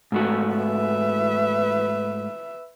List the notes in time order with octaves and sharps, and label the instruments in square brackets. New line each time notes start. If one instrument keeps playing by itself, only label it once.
[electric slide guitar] G#2 A3 F#4
[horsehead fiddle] B4 E5